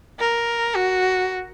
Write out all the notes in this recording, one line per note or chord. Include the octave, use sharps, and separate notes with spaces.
A#4
F#4